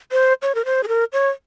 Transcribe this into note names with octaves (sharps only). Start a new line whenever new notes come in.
C5
C#5
A#4
C5
G#4
A#4
C#5